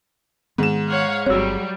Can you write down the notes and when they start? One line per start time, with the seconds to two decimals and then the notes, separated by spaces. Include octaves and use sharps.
0.58 G#2 D#3 B3 E7
0.89 C#5 F5 F#5
1.26 G1 F#3 G3 C4 C#5 E6